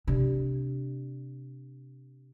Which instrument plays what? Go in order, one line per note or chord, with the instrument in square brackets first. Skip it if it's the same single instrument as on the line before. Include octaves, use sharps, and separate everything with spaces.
[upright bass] C3 D4